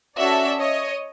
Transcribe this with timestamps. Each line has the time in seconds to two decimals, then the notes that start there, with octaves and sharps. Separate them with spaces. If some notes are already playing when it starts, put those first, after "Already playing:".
0.15 C#4 F#4 A4 D5 E5
0.58 C#5 D#5